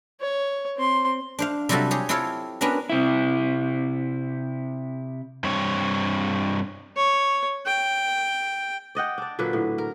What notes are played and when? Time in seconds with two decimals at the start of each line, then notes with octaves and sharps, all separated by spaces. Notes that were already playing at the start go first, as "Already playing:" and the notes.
0.20 C#5
0.77 C4 C6
1.39 D4 C5 F5
1.69 C3 F#3 G3 F4 F#4 A4
1.91 G4 G#4 C#5
2.09 C4 E4 F4 A4 C#5 F5
2.61 B3 C#4 D4 F#4 A#4
2.90 C3 E4
5.44 G2 C4 C#5
6.97 C#5
7.66 G5
8.95 D5 D#5 F#5 G5
9.18 D4 D5
9.39 A#2 D3 F#3 B4
9.53 A2
9.78 A#4